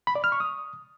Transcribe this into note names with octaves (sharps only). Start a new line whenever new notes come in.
B5
D5
F6
C#6
D#6